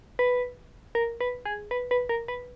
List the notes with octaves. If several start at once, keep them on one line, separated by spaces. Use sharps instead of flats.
B4
A#4
B4
G#4
B4
B4
A#4
B4